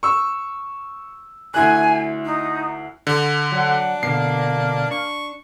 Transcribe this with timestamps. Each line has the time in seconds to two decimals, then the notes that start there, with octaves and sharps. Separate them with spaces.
0.03 C#6 E6
1.54 D2 E4 G#5 F#6
2.25 D#4
3.07 D3
3.52 F#3 D4 F#5
4.03 B2 D3 A#3 C7
4.91 D4 C#6